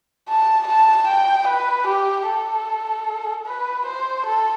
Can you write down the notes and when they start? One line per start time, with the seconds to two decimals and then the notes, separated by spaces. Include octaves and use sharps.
0.29 A5
0.67 A5
1.07 G5
1.48 B4
1.87 G4
2.27 A4
3.46 B4
3.86 C5
4.26 A4